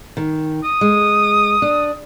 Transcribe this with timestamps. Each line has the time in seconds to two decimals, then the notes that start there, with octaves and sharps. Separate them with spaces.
0.17 D#3
0.64 D#6
0.81 G#3
1.62 D4